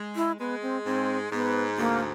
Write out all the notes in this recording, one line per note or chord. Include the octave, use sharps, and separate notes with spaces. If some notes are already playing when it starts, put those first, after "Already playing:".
Already playing: G#3
E4
G#3 B3
C4
G#2 C4
G#2 B3
D2 A#3